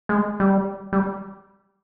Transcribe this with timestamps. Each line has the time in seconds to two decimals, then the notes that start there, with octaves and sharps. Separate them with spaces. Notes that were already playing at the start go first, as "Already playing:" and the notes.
0.09 G#3
0.40 G3
0.93 G3